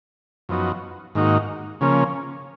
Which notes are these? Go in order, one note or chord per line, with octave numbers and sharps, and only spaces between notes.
F#2 F3 B3 D#4 F#4
G#2 D#3 A#3 D#4 F#4
C#3 F3 A#3 C#4